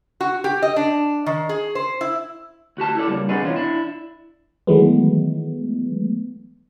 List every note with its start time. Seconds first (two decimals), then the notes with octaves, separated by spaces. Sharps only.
0.21 F#4
0.44 G4
0.62 D#5
0.76 D4
1.26 D#3
1.49 G#4
1.75 C5
2.01 E4
2.77 D2 F#4 G4 A5
2.95 E4 G4 A4 D5
3.08 C#3 G3 A#3
3.29 C4 D4 D#4 F#4 G#4 B4
3.42 B2 E3 C#4 F4 C5
3.56 D4 E4
4.67 D#3 E3 F#3 G#3 A3 B3